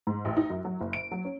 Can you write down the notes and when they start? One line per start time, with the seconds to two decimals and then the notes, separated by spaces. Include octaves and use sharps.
0.07 G#2
0.25 A1
0.37 D#4
0.50 F#2
0.65 F#3
0.81 F#1
0.93 D7
1.12 F#3
1.25 C#4